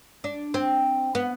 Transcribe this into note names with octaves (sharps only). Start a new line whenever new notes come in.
D4
C4
B3